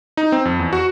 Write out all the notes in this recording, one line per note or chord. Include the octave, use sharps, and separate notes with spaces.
D#4
C4
F2
E2
F#4